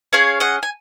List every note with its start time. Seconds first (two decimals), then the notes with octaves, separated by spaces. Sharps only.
0.13 C#4 G#4 C#5 F5
0.40 D#5 F#5
0.63 G#5